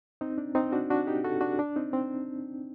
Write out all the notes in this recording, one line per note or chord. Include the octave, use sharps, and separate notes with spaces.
C4 D#4
D4
C4 D#4
D4 F#4
D4 F#4
D#4 G4
F#4 A4
D4 F#4
D4
C4 D#4
C4